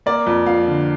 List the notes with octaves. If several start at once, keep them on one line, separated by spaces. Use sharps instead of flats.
A#3 D5
F2
F3 F5
D3